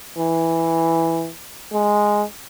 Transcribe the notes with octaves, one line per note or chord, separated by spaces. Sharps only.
E3
G#3